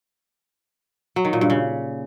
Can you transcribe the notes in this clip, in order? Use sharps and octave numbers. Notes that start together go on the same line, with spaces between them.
F#3
D#3
A#2
G2
C#3